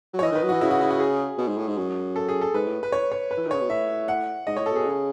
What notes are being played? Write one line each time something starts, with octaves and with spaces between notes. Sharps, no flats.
F#3
C#5
E3 D#5
D#3 B4
F#3
E3 F#4
C#3 E4
F#4
E4
F#4
G#4
B2
G#2
A2
G#2
F#2
A4
G#4
A4
G#2 B4
A2
B4
C#5
C#5
B4
E3
D#3
C#3 C#5
B2
A2 E5
F#5
G#2 D#5
A2 C#5
A4
B2 G#4
C#3